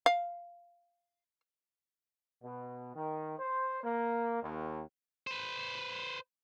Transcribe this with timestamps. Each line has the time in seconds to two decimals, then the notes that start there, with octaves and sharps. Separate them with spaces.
0.06 F5
2.43 B2
2.95 D#3
3.39 C5
3.82 A#3
4.42 D#2
5.27 B4 C5